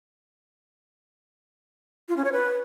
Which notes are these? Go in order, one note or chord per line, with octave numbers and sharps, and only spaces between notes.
F4
C#4
C#5
B4